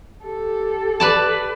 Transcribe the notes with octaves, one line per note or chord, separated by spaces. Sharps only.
G4 A4
B4 D5 A5